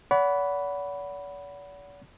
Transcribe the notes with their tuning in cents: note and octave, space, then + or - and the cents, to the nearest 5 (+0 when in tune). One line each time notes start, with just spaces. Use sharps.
D5 -45 F#5 +5 B5 +0